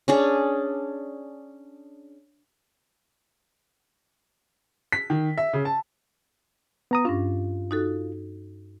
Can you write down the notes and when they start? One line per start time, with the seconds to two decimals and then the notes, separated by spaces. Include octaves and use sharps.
0.08 C#4 D4 G#4
4.92 B6
5.10 D#3
5.38 E5
5.53 C#3
5.65 A5
6.91 B3 A#5 D#6
7.05 G2 C#4 D4 F4
7.71 D#4 F#4 A4